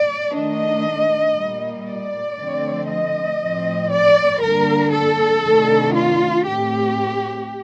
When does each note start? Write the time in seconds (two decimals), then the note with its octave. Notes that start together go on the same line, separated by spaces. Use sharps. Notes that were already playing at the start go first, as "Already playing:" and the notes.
Already playing: D5
0.33 D#3 A3 D4 D#5
1.35 A#2 G3 A#3
1.86 D5
2.37 D3 F3 A3 C4
2.89 D#5
3.40 A2 F3 C4
3.91 D5
4.41 D3 G3 A#3 D4 A#4
4.92 A4
5.43 C3 D#3 A3 D4
5.94 F4
6.46 A2 A3 C4 G4